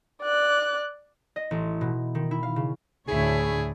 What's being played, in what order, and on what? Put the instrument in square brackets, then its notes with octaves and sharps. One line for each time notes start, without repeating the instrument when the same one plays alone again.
[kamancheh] D5 F#6
[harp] D#5
A1
B2
D#3
E4
F5
C#3
[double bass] D2 A2 [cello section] D4 E4 C#5 [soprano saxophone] G#4